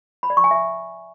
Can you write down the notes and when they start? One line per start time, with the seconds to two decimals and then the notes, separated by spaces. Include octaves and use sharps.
0.23 B5
0.30 D5
0.37 C#6
0.44 G#5
0.51 E5